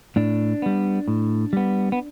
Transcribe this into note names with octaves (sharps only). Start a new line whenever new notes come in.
A2 D4
G3 B3
A2
G3 B3
B3